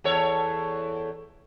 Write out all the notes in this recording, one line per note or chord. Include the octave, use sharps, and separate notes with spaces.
E2 A4 C#5